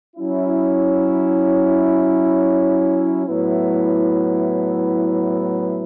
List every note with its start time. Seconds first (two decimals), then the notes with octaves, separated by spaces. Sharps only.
0.16 F#3 C#4 E4
3.26 A2 F#3 B3 E4